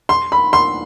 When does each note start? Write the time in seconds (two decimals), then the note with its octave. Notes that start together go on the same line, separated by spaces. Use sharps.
0.09 C6
0.32 B5
0.53 C6